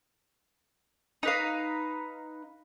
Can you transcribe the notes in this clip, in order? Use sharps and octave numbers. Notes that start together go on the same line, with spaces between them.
D#4 B4 F5